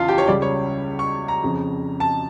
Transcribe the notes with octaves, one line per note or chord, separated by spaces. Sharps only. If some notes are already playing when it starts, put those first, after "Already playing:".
Already playing: E2 C#3 E3 F4 F5 A5
G4
C#5
C#2 C#3 G3 D5
C#5
C#6
A#5
F2 C#3 F3
A5